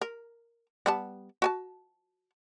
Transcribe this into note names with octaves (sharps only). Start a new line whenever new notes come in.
A#4
G3 B3 A5
F#4 G#5 A5